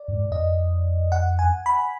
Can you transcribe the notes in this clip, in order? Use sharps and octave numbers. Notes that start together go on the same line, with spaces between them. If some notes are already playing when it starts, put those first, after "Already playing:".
Already playing: D5
F#2
G#2
F2 D#5
F#5
G#5
B5